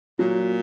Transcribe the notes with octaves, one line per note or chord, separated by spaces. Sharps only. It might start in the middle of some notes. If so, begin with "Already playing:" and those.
A#2 F#3